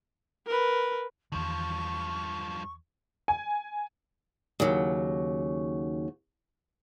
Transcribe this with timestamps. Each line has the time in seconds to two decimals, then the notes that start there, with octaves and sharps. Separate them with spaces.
0.46 A#4 B4
1.32 E2 G2 D#3 F3 C#6
3.28 G#5
4.60 D#2 C#3 F#3